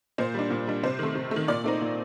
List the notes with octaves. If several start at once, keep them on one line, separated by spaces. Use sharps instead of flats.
A#2 C5
G3 D4
A#2
G3 D4
C3 C5
D#3 A3
C3
D#3 A3
A#2 D5
A3 C4 D#4
A#2